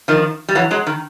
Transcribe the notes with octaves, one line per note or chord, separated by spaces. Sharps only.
D#3 F3
G3
E3 F#3
F#3 G#3
D#3